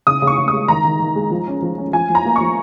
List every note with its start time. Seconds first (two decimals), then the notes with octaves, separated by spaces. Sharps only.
0.07 C#3 D#6
0.22 C#3
0.27 C#6
0.38 C#3
0.48 D#6
0.53 G#3
0.68 D#3 A#5
0.85 D#3
1.00 D#3
1.16 G#3
1.31 F3
1.47 C#4
1.62 F3
1.78 C#4
1.93 F3 G#5
2.10 F3
2.15 A#5
2.25 A#3
2.36 F3 C#6